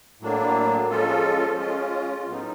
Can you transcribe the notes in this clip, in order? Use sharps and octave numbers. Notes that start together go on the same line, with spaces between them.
A2 F#3 A#3 D4
F3 G#3 C#4 F4 A4
G#3 C#4 F4
A2 F#3 B3 D#4